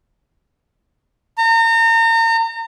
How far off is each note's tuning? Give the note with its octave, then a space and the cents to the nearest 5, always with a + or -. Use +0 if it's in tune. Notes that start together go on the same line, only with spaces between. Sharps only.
A#5 -35